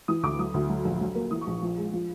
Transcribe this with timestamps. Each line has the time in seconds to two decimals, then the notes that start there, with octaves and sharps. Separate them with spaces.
0.08 E3 D#6
0.23 D2 D6
0.39 F#3 D#6
0.54 D2
0.69 F#3
0.85 A#1
1.01 F#3
1.15 A#3
1.31 E3 D#6
1.41 C#6
1.47 A#1
1.62 F3
1.78 G#3
1.93 F3